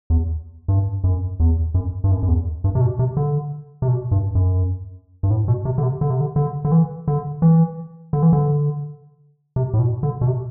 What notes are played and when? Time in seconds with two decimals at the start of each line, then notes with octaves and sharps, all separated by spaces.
0.10 E2
0.68 G2
1.04 F#2
1.40 E2
1.74 F#2
2.04 G2
2.11 F#2
2.23 F#2
2.28 E2
2.64 G2
2.75 C3
2.81 B2
2.99 C3
3.17 D3
3.82 C3
3.88 B2
4.11 G2
4.35 F#2
5.23 G2
5.30 A2
5.48 B2
5.65 C3
5.78 D3
5.83 C3
6.01 D3
6.10 C3
6.21 D3
6.36 D3
6.65 D3
6.72 E3
7.08 D3
7.42 E3
8.13 D3
8.23 E3
8.33 D3
9.56 C3
9.74 A2
9.79 B2
10.03 D3
10.21 B2
10.27 C3